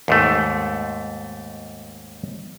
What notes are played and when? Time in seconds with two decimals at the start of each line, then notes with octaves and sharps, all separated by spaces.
0.08 D#2 G#2 A3